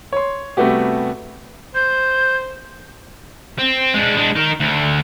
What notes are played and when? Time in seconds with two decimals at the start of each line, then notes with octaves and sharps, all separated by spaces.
0.13 C#5 C6
0.57 C3 G3 A3 B3 F#4 G4
1.75 C5 G6
3.59 C4
3.94 G#3 D4
4.17 G#3 D4
4.36 D#4 A#4
4.60 D2 D3